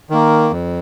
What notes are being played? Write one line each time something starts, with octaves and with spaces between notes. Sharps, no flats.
D#3 A#3
F2